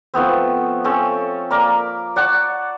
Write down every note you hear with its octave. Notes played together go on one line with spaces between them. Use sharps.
F3 A3 B3 C4
C4 C#4 A4
A#3 A#4 D5 B5
D5 F#5 A5 C#6